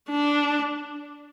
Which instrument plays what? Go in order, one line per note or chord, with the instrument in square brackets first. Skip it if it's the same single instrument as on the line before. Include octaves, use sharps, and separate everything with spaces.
[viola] D4